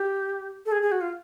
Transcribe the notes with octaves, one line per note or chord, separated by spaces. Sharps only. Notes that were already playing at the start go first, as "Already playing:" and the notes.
Already playing: G4
A4
G#4
G#4
F#4
F4